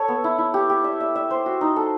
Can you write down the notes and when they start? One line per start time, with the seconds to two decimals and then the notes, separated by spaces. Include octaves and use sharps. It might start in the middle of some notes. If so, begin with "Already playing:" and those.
Already playing: A4 C#5
0.08 B3
0.24 E4
0.38 E4
0.54 G4
0.70 G4
0.84 E5
1.00 E5
1.15 E5
1.31 C5
1.46 F#4
1.61 D#4
1.76 A4